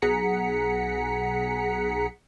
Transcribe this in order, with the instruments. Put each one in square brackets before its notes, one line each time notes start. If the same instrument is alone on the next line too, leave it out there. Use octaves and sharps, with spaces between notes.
[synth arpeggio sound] B1 G#4 F#5 A#5 B6 C#7